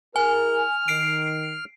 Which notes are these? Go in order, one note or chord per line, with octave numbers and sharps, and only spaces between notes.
E4 G#4 A#4 G#5 F6
D#3 C7 D7